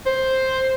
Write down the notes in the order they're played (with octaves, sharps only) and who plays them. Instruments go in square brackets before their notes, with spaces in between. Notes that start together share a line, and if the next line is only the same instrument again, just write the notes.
[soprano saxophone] C5